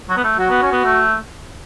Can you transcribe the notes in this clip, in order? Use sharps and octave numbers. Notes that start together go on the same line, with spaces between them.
F#3
B3
A3
F#3 F#4
B3
C#4
B3
A3